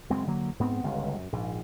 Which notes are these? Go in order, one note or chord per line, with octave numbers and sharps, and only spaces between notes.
F#1 G#3 C4
D3 F#3 A#3
G#2 B3 C4
G1 C#2
F#2
A#1 G#2